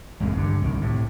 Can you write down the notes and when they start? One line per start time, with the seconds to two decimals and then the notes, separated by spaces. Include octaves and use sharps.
0.20 G#1 C#2 F#2 C#3
0.37 G2 D3
0.62 C2 D#3
0.81 A2 C3